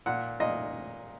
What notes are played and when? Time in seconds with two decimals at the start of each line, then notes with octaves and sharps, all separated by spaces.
0.06 A#2 F#5
0.40 A#2 D#5